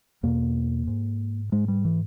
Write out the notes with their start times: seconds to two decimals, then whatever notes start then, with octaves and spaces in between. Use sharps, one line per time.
0.23 E2 B2 A#3
0.87 G#2
1.52 G#2 G#3
1.68 G3
1.85 E3